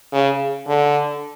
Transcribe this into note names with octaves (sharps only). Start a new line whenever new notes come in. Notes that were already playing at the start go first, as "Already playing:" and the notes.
C#3
D3